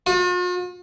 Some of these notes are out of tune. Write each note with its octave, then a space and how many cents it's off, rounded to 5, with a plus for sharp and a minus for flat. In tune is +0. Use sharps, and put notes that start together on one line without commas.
F4 +45